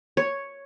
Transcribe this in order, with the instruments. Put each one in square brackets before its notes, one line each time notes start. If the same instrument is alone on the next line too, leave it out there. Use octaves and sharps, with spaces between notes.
[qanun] C#5